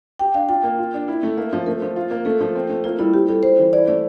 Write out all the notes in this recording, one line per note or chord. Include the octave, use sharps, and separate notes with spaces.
G4 G5
D4 F5
F4 G5
A#3
F4
D4
E4
A3
A#3 E5
F3 C5
A3 A#4
F3
F4
A#3
A3 A4
F3
C4
A3
A#3 F4
G3 E4
C4 G4
G3 A4
G3 C5
E3
E4 D5
A3 D5